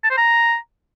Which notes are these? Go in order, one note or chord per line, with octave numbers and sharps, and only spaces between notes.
A5
C5
A#5